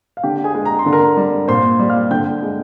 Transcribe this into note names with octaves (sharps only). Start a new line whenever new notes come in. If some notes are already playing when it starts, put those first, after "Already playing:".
F5
D3 G4 G5
G#4 G#5
G#3
A#5
C6
D3
A#4 A#5
G3
A#2 C5 C6
G3
F5 F6
D3 G5 G6
G#3